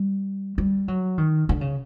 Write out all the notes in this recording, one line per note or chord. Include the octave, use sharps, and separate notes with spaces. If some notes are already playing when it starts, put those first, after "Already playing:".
Already playing: G3
G3
F#3
D#3
D3
C#3